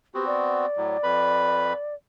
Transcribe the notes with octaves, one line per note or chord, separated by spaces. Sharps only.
B3 C4 F#4 G4
D5
A2 F#3
F2 B4 B5